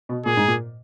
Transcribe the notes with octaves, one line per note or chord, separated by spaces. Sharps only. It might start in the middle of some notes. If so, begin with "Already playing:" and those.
B2
A#2 G#4
G#2
A#2